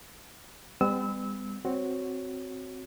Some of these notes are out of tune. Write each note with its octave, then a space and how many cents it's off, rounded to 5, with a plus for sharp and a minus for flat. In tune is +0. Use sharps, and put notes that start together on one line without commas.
G3 +40 B3 +45 E6 -25
C4 +0 F#4 +0 C#5 +0